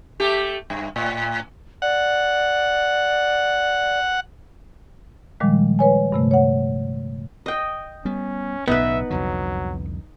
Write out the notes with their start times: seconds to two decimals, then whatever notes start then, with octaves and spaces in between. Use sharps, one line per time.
0.20 A3 G4
0.70 G2
0.96 A2
1.82 D5 F#5
5.40 A#2 D#3 F3 G3 G#3
5.79 B4 C#5 G#5
6.12 G2 C3 A3
6.31 C#5 F#5
7.46 D#5 G5
8.05 G3 B3 C#4
8.68 B1 A2 C#3 B3 D#4 B4 E5
9.10 C2 F2 D3 F#3